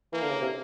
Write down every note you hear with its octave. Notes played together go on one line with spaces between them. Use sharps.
E3 A#3
D3
C#3
C3